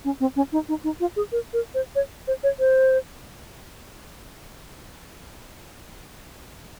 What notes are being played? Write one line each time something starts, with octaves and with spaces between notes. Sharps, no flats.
C#4
C4
C#4
D#4
D#4
D#4
F4
G#4
A#4
A#4
C5
C#5
C5
C#5
C5